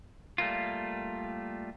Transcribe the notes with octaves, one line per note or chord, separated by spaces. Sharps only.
G3 A3 A#3 F4